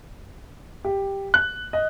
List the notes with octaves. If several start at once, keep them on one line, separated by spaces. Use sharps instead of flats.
G4
F#6
D#5